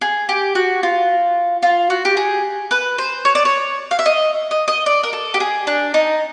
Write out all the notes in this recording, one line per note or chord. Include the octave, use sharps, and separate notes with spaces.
G#4
G4
F#4
F4
F4
F#4
G4
G#4
B4
C5
C#5
D5
C#5
F5
E5
D#5
D#5
D#5
D5
A#4
A4
G4
G#4
D4
D#4